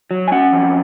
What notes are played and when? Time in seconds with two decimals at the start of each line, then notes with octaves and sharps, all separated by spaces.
0.11 F#3
0.28 G#5
0.32 C#4 F#5
0.53 F2